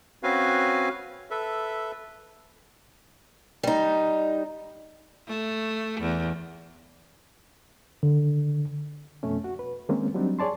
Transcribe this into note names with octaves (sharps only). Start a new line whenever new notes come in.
C4 C#4 F#4 B4 F5 G#5
A4 B4 E5
G3 D#4
A3
E2
D3
F2 B2 A3 C#4
F#4
B4
D#3 G#3 A#3 C4 C#4
F#3 G3 C4 D4 D#4
G#4 C#5 D5 A5 C6